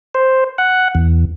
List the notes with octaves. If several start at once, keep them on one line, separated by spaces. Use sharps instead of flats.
C5
F#5
E2